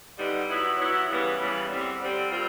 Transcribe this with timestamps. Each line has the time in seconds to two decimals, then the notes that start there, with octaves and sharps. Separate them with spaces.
0.18 D3 G3 B3 D#4
0.49 F#3 B3 E4
0.78 F#3 B3 E4
1.09 C#3 E3 G3 B3
1.39 C#3 E3 G3 B3
1.69 D3 G3 C4
2.00 D3 G3 C4
2.30 A#2 G3 C4 F4